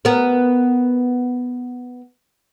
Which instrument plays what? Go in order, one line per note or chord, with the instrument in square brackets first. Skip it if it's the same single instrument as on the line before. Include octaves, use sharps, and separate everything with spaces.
[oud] B3 A#4